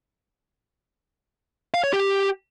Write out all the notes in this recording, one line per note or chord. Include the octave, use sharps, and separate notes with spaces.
F5
C#5
G4